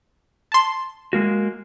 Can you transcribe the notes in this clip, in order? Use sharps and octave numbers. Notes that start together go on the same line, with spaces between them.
A5 C6
G#3 A#3 F#4